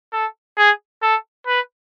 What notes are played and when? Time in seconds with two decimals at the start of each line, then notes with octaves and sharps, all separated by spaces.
0.12 A4
0.57 G#4
1.02 A4
1.47 B4